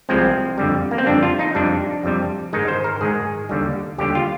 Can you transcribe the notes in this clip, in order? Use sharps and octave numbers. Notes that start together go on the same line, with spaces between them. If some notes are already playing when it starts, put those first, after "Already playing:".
C2 C3 F3 G#3 C4
F2 D3 G3
A#3
C4
F2 D3 G3 D4
F4
D#4
F2 C3 G3 D4
F2 C3 G3
G#2 D#3 G#3 D#4
C5
A#4
G#2 D#3 G#3 G#4
D#2 D3 G3
D#2 D3 G3 G4
F4